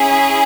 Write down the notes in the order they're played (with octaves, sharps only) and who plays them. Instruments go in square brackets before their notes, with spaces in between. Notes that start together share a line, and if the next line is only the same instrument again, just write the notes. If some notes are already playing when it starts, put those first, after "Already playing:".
Already playing: [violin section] C#4 E4 G#4